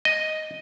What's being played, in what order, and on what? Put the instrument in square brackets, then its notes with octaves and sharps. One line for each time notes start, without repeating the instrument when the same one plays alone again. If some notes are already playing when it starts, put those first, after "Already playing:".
[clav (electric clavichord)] D#5